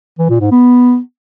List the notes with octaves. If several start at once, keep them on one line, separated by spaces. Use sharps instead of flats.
E3
A#2
G#2
B3